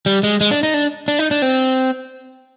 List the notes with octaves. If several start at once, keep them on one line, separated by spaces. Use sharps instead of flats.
G3
G#3
G#3
D4
D#4
D4
D4
D#4
D4
C4